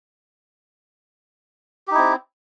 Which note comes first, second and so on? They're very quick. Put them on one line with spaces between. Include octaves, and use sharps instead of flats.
G4 D#4 E4 C4